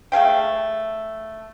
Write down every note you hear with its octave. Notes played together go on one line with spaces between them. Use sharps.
A3 G#4 F5 G5